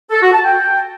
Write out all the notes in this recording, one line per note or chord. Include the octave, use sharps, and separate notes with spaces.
A4
F#4
A5
G5